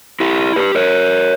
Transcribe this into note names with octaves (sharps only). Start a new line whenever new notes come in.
E4 G4
G4 B4
A#4 C#5